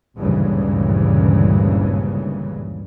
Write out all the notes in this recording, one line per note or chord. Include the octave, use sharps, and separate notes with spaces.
G#1 D2 G2 A#2 C#3 E3